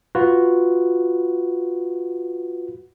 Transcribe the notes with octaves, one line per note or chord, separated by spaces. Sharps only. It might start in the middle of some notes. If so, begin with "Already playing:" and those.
F4 F#4 B4